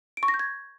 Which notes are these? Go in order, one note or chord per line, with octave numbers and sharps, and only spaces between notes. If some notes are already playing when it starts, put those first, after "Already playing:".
D7
C#6
A#6
G6
G#6